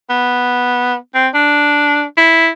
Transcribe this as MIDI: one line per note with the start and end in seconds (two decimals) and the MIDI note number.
0.10 0.95 59
1.15 1.28 60
1.34 2.02 62
2.17 2.48 64